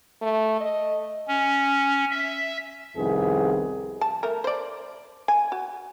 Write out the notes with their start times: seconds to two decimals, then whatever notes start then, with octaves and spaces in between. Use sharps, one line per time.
0.22 A3
0.60 D#5
1.28 C#4
2.11 E5
2.97 C2 F2 D#3 B3 C4 G#4
4.01 A5
4.23 A3 A#4
4.44 C5 D5
5.28 G#5
5.52 F#4